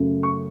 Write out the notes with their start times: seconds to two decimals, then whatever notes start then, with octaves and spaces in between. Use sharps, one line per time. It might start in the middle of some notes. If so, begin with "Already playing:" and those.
Already playing: F#2 C#3 F#3 A3 C#4
0.23 C#6